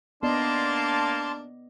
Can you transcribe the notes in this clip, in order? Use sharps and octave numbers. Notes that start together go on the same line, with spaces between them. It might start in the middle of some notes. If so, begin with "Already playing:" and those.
A#3 B3 D4 D5 D#5 A5 C6